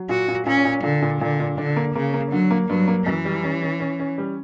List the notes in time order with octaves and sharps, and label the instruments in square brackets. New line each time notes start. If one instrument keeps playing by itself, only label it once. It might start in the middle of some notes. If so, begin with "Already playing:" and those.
Already playing: [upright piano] F#3
[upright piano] A#2 [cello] F#4
[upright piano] A#2
[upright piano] A#2 [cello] C#4
[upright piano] A#2
[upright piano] A#2 [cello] D3
[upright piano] A#2
[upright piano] A#2 [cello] D3
[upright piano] A#2
[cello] D3 [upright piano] D4
[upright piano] A#3
[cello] C#3 [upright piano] A#3
[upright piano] A#3
[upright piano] D3 [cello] F#3
[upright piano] A#3
[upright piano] G2 [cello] F#3
[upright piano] A#3
[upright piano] F#2 [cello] E3
[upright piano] G3
C#4
C#4
C#4
C#4
G3